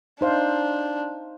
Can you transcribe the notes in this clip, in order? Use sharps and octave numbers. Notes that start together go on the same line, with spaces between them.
D4 D#4 C5 F5